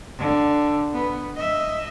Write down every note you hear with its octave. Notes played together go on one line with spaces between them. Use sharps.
D3
B3
D#5 E5